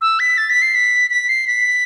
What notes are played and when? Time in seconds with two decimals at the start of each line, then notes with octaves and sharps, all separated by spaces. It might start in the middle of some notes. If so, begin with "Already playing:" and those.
0.01 E6
0.20 B6
0.38 A6
0.50 B6
0.62 C7
0.75 B6
1.11 B6
1.29 C7
1.47 B6